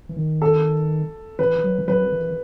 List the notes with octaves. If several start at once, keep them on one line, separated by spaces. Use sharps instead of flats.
E3
D#3
A4
E3 B4
F#3
E3
F#3 B4
E3